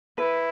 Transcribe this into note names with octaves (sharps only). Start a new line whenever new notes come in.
E4 B4